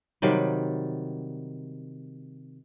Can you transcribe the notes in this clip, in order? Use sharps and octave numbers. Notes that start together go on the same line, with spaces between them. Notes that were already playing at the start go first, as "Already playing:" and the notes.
C3 D#3 F#3 G3